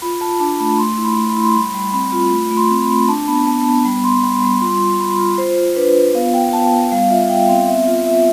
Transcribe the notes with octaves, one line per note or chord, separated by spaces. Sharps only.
F4 B5
F4 A5
D4 A5
A3 B5
A3 C6
E4
B5
A3
B5
E4
C6
G3 B5
G3
C4 B5
F4
A3 B5
A3
C6
C4
B5
A3
D4 A5
B3 B5
B3 A5
B3
G3 B5
G3 C6
G3 B5
G3 B5
F4 C6
F4
F4 B5
F4
F4 C5
F4
D4 B4
F4
B3 F5
F4 G5
B3 A5
B3
G3 F5
F4 E5
G3 G5
C4 F5
B3 E5
F4
F4 E5